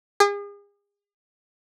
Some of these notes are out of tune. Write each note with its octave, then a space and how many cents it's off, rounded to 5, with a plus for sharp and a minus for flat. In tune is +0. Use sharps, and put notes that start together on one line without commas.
G#4 -40